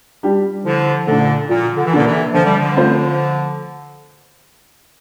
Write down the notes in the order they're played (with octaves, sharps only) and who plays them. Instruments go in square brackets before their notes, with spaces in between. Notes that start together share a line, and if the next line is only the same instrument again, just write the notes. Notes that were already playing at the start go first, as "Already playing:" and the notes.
[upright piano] G3 D4 G4
[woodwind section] D3 F3 [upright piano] E3
[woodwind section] A#2 D3 [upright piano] A3 D4
[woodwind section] A#2 [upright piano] F3
[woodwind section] D3
E3
[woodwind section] A#2 D3 [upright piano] A#3 D4 A4
[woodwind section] C3 E3
[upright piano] D3 [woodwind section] F3
[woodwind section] G3
D3 F3
[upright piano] A3 C4 F4 C5